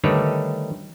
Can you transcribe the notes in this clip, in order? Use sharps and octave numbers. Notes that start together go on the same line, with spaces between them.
D3 D#3 G3 A3 B4 C#5